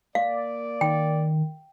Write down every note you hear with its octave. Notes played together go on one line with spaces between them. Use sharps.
A#3 D5 F5
D#3 G5